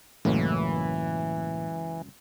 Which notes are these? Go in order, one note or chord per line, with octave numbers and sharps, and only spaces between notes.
C#2 F#2 A2 E3 A#3